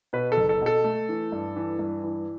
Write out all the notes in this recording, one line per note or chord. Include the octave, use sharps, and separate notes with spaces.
B2 B4
A4
F#1
A4
B2
A4
A3
E3
G2
E3
G2
E3